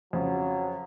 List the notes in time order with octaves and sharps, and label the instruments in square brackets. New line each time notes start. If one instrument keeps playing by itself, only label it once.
[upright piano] F2 C#3 [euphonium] F#3